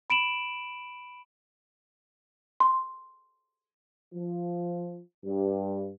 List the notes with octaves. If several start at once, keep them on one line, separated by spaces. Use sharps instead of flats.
B5 D7 E7 F#7
C6
F3
G2